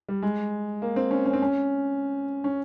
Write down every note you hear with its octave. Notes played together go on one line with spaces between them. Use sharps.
G3
G#3
A#3
C4
C#4
C#4
C4
C#4
C#4